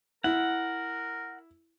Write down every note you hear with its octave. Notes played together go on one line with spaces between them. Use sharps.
E4 A#4 F#5